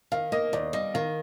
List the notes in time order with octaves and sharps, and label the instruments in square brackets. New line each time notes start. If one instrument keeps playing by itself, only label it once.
[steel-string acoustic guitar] D#3 [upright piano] F5
[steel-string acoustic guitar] A#3 [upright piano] D#5
[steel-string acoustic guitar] D#2 [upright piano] D5
[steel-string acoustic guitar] G3 [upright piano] D#5
[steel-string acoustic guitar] D#3 [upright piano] F5